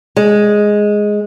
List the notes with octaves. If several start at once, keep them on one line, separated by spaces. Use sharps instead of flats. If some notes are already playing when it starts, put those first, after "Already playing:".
G#3